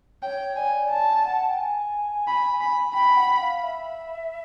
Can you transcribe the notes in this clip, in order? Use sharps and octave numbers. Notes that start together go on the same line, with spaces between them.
C#5 G5
D5 G#5
A5
F#5
G5
G#5
B5
B5
G5 B5
F#5
F5
E5